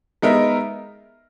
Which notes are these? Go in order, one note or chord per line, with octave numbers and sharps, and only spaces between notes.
G#3 B3 D#4 A#4 E5